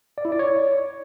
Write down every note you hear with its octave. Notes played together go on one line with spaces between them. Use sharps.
D5
E4
D5
C#5